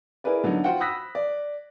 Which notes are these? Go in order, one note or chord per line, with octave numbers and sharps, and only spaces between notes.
E4 G#4 A#4 B4 D5
D3 F#3 B3 D#4
F4 F#4 C5 F#5 G5
B5 D#6 E6 F#6 A#6 B6
D5